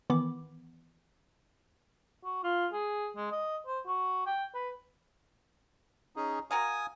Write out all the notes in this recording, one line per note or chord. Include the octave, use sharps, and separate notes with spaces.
D#3 E3 B3 B5 D6
F#4
F4
G#4
G#3
D#5
C5
F#4
G5
B4
C#4 D#4 G#4
F#4 A#4 F5 G#5 D#6